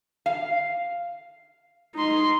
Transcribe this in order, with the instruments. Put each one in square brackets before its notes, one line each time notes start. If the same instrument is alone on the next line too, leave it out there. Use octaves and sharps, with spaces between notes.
[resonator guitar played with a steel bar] F5
[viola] D#4 C6